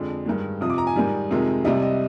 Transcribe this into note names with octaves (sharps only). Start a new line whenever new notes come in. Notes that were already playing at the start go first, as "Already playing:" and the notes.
Already playing: F2 D3 G#3
G2 D#3 G#3
F2 C3 F3 D#6
D6
A#5
G#5
G#2 D#3 G3
F2 C3 D#3 G#3
C2 C3 G3 D#5
D#5